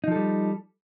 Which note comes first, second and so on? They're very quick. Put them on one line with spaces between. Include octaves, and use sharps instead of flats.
D#4 F3 A4 G3